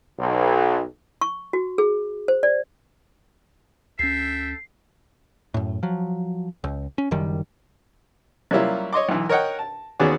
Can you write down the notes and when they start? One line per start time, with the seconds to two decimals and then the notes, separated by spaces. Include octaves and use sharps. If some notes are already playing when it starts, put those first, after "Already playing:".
0.18 B1
1.21 C#6
1.53 F#4
1.78 G#4
2.28 C5
2.43 D5
3.99 D2 C#4 A4 E5 G5 C7
5.54 F#2 A2
5.83 F3 F#3
6.64 C#2
6.98 C#4
7.11 F#1 F#2 D#3 G3
8.51 F#3 G3 A#3 C#4 E4 F4
8.93 C#5 D#5 C6 D6
9.09 B1 E3
9.29 A#4 C#5 D#5 F#5 G5
9.59 A5
9.99 D#2 B3 C#4 F#4 G#4 D5